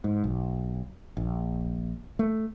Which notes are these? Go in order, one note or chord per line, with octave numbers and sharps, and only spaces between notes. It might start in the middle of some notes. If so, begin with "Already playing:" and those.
G#2
B1
A#1
A3